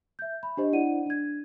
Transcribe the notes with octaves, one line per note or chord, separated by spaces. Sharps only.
E5 G6
B5
D4 G4 C5 D#5
D4 E4 D5 F#5 D#7
D4 G#6